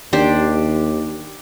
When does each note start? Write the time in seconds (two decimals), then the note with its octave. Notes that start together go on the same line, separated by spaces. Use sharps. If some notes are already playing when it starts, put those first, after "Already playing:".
0.13 D#2 D4 G4 C5